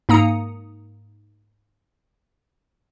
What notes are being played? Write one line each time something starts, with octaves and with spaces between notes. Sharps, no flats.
G#2 A#3 A#5 D#6 C#7